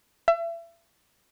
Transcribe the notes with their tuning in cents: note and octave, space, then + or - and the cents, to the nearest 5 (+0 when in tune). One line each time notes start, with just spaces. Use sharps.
E5 +35